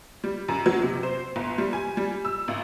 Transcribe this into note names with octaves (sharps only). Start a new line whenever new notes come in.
G3
F#2
F#3
C3
C5
G1
G3
G#5
G3
E6
G#1